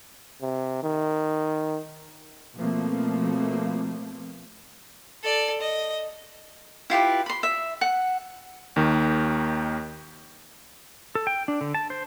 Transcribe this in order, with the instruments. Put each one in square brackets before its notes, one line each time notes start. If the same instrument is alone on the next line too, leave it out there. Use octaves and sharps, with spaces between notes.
[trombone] C3
D#3
[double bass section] B2 F3 A3 A#3 C4
[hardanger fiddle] A4 D5
D#5
[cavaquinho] E4 F4 G4 B4
B5 C6
E5
F#5
[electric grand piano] D#2 D#3
[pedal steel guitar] A4
G5
D4
D3
A5
C5